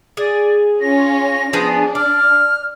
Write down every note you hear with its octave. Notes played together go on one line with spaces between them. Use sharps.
G#4 D5
C#4 F4 A#6
F3 B3 D4 G#4
D5 F6